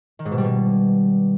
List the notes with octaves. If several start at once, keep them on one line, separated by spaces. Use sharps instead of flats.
D#3
G#2
B2
G3
B2